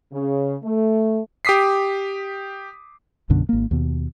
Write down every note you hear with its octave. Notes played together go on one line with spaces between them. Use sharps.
C#3
A3
G4 D6 D#6 B6 C7
B1 F#2 B2 D3
G#1 A#3
D#2 B2